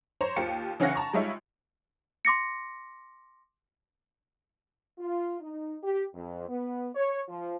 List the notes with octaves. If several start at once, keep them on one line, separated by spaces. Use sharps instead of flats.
C5 C#5 A#5
D#2 F4 G4 C#7
C#3 E3 C#4 F5 F#5 A#6
A5 A#5 C#6
G3 G#3 D#4 F4 C#5 E5
C6 D6 A#6 C#7
F4
D#4
G4
F2
B3
C#5
F3